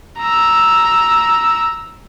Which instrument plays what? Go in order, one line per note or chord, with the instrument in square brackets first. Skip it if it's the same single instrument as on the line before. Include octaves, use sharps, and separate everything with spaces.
[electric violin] A#5 E6